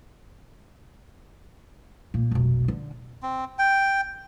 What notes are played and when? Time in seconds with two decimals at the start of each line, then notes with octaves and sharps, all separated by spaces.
2.14 A#2
2.31 F1 B1
2.68 D3
3.23 C4
3.59 G5